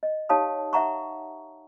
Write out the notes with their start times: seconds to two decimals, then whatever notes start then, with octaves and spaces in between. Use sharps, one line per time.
0.03 D#5
0.29 D#4 G4 C#5 F5 A5 D#6
0.73 D#4 E5 F#5 A#5 C#6